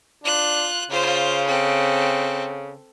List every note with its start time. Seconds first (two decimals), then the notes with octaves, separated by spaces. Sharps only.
0.24 D4 F4 F#6
0.90 C#3 F4 C5
1.47 C4 A4